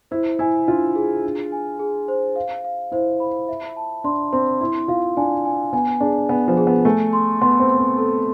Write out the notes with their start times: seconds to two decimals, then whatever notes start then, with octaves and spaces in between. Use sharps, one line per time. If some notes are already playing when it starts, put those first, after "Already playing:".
0.11 E4 C5
0.39 E4 G#5
0.67 D4 F4
0.95 G#4
1.23 D4
1.52 G#5
1.80 G#4
2.08 C5
2.36 F5
2.65 F5
2.92 E4 C5
3.20 B5
3.48 E5
3.76 A5
4.04 D4 C6
4.33 C4 C6
4.61 E4 C6
4.88 F4 F5
5.17 D4 G#5
5.45 G#5
5.73 B3 G#5
6.00 D4 G#4
6.29 B3 G#5
6.48 F3
6.57 G#4
6.67 B3
6.85 A3 G#5
7.13 C6
7.41 B3 C6
7.60 C4
7.70 C6
7.79 C4
7.98 A4